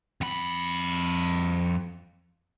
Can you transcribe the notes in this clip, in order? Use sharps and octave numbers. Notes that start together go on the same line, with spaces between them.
F2 B5